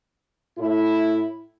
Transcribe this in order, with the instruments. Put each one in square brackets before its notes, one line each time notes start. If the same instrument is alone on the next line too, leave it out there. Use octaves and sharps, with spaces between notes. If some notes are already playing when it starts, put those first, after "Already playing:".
[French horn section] A2 E4